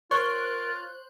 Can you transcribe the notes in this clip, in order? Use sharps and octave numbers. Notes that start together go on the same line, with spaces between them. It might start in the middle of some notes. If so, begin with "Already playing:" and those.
F4 A#4 C5 C#5 F#6